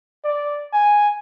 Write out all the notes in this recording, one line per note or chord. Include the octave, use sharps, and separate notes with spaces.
D5
G#5